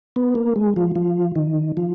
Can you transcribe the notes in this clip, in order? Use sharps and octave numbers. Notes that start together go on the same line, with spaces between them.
B3
A#3
G#3
F3
F3
D#3
F3